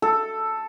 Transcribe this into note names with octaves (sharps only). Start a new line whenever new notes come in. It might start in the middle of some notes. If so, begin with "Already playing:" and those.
A4